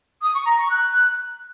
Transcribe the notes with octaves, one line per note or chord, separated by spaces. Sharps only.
D#6
C#6
A#5
C#6
F#6